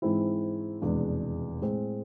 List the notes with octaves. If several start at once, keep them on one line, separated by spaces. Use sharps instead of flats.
G#2 E3 G#3 C4 E4
F1 E2 B2 G#3 D4
A2 G#3 C4